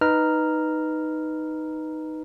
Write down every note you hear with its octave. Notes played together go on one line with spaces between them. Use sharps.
D#4 B4 A#5 F6